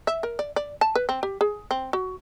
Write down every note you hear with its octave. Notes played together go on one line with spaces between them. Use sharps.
E5
A#4
D5
D5
A5
B4
C4
G4
G#4
C4
F#4